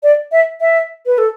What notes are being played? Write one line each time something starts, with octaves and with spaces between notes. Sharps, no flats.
D5
E5
E5
B4
A4